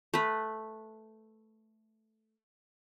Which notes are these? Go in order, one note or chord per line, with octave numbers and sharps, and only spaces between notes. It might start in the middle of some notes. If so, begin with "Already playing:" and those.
A3 B4